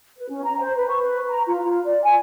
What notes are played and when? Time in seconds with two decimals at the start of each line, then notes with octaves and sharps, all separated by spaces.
0.18 B4
0.30 C#4
0.45 A#5
0.59 C5
0.76 B4
0.89 C#6
1.04 B4
1.30 A#5
1.47 F4
1.64 F4
1.85 D5
2.04 G#5